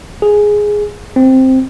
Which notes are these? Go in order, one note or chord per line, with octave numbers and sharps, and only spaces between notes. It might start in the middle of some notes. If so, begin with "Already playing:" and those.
G#4
C4